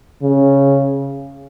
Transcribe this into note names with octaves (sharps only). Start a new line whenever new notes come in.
C#3